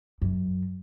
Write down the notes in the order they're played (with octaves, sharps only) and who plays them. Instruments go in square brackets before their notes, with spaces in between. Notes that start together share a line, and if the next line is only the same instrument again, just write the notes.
[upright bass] F#2